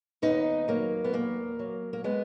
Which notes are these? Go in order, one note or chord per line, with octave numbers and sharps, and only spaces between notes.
D#2 B3 D#4
F#3 A#3
B3
E2 A#3
F#3
A#3
G#3 B3